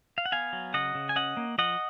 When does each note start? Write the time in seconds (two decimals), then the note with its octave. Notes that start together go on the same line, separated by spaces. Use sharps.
0.18 F5
0.26 F#5
0.32 B3 F5 G#5
0.53 F#3
0.74 C#3 D#5 F#5
0.95 C#3
1.09 G#5
1.16 C#4 D#5 F#5
1.37 A#3
1.58 F3 D#5 F#5